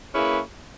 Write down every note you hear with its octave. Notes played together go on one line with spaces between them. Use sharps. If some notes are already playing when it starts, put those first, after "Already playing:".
A#3 C#4 E4 G#4 B4